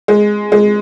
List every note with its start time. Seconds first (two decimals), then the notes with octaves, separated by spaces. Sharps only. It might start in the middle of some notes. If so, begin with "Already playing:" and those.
0.08 G#3
0.52 G#3